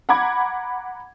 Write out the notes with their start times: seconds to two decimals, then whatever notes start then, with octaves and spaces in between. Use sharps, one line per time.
0.09 F#5 A#5 B5 D6 G#6